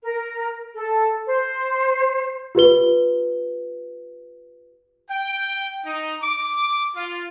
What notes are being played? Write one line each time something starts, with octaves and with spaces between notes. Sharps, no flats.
A#4
A4
C5
F4 G4 B4 G7
G5
D#4
D6
F4